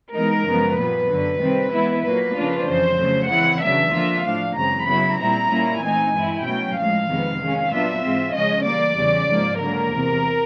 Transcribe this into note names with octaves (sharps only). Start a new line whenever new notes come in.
E3 G#3 B3 D#4 A#4
F#2 C#3 F3 G#3 B3
A#2 G3 B3 B4
F#2 D3 F#3
C3 D#3 G3 C4
E3 G#3 B3 E4
A#2 F#3 A#3 B4
C#3 F3 A#3 D4 F4
F2 C#3 E3 C5
C#3 F#3 A3
C#3 E3 G#3 C4 E4 F#5
E2 C#3 F#3 B3 D4 E5
D3 F3 A#3 D4 F4
A2 F3 A3 D4 F5
F#2 C#3 E3 G#3 C4 A#5
C#3 F#3 B3 E4 B5
A#2 G3 C4 E4 A#5
A#2 G3 A#3 C#4 E4
E3 A3 C4 D#4 G#5
G2 E3 G#3 C4 E4
B2 F#3 A3 C#4 G5
A2 F3 G#3 F5
F2 C3 D#3 G#3 B3
D#3 G#3 C#4
A#2 F#3 B3 D4 F4 E5
G#2 E3 G#3 C4 F4
C#3 F3 G#3 C#4 D#5
E3 G3 A#3 D5
E2 C#3 E3 G3
G#2 F3 A#3
D3 F#3 A#3 A#4
E2 C3 E3